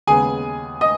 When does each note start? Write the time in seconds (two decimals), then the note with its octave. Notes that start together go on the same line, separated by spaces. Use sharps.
0.07 D#2 C#3 G#3 B3 G#4 G#5
0.81 D#5 D#6